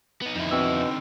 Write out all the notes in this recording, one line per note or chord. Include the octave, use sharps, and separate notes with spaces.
B3 D#4
F2 D3 D#4 E4
B2 C4 E6